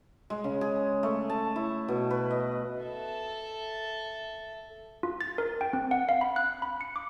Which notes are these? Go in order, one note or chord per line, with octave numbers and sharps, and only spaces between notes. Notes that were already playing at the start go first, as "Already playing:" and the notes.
G#3
C#3
G#4
A3
A5
E4
B2
B4
D#5
A4 E5
F4
A6
A#4
G5
C4
F#5
F5
B5
F#6
B5
C#7
D6